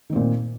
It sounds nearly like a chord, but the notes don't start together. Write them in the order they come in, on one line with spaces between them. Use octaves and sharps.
D#3 C4 A#2